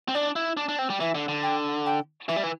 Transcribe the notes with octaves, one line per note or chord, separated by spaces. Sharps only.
C4
D4 D5
E4
D4
D4
C4
G3
E3 E5
D3
D3
G5
G5
E3 E5
G3
E3